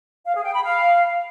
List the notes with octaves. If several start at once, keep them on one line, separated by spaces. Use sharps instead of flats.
F5
G#4
G5
B5
F5